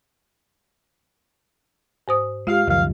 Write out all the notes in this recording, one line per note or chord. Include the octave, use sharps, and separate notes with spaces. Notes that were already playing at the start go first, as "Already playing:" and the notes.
G#2 C5 D#6
G#3 F4 G4 F5
C#2 F#2 A#2 D#3 F3 F5